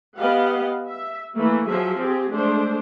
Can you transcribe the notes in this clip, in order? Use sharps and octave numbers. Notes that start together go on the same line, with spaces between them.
B3 G4 D#5 F5 F#5
E5
E3 A3 A#3
F3 F#3 G#4 E5
C4 G4 G#4
G#3 A3 D4 C5